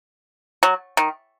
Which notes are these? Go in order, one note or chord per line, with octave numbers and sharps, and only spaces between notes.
F#3
D#3